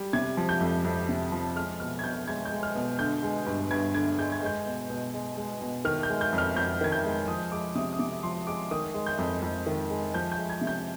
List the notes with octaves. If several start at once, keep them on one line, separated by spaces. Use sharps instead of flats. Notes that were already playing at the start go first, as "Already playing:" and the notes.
Already playing: G3
C3 G#6
F3
G6
F2
F2
C3
F3
G#3 F6
B2 F6
G#6
B2 G6
G#3 G#6
G6
G#3
F6
B2
D3 G6
G#3
G2
G2 G#6
D3 G#6
G#3 G6
G#6
G#3 G6
B2
B2
G#3
G#3
B2
D#3 F6
G6
G#3
G6
F2
F6
F2 G6
D#3 G#6
G6
G#3
F3 D#6
G#3 D6
C3 D#6
D#6
C3 D6
F3 C6
G#3 D6
D#3 D#6
G#3
G6
F2
F2
D#3
G#3
F3 G6
G6
G#3
G#6
C3
G6